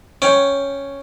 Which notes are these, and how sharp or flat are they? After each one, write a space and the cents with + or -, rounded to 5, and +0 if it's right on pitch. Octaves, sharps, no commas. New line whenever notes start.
C#4 +0 C#5 +0 G5 +0